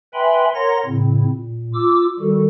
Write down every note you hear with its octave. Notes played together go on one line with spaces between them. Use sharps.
B4 E5 G5 G#5 B5 C6
A#4 C#5 F#5 A#5 C6 A#6
A2 C#3 C4 E4
A#2
F4 D6 E6
D#3 G3 F#4 A4